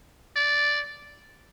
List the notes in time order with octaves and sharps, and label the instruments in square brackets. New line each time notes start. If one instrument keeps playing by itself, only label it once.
[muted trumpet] D5